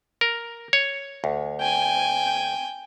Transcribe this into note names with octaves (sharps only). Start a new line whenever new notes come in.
A#4
C#5
D2
G5 G#5